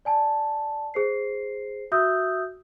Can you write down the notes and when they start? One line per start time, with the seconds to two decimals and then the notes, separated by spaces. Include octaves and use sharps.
0.05 D5 G#5 A5
0.94 G#4 C5 C7
1.92 F#4 E5 D#6 E6 G6